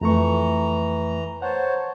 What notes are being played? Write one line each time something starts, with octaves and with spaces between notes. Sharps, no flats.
F2 E3 A3 A#5 C#6
C5 C#5 F#5 A5